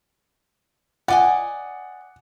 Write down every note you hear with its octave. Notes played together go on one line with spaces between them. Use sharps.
D5 D#5 F#5 G#5